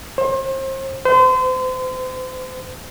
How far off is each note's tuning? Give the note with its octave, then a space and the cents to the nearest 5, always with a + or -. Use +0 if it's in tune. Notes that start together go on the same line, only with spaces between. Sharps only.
C5 +35
C5 -35